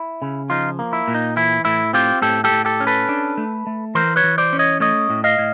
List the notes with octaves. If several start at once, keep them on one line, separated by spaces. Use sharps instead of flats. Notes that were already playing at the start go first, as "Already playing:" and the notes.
Already playing: E4
C#3
F3 D#4 F4
A#3
E4
A#2
D#4
E3 E4
A2 E4
C4 F4 G4
A2 G4 A4
G4 A4
A2
G4 A4
C#4
A4 B4
D4
A3
A3
E3 A#4 C5
B4 C#5
E3
C5 D5
C#4
C#5 D#5
A3 C#5 D#5
A2
D#5 F5
A2